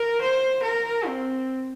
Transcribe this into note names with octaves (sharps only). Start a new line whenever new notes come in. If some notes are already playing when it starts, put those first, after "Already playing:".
Already playing: A#4
C5
A#4
C4